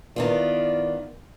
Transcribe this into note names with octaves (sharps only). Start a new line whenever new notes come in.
D#3 B3 E4 F4 D5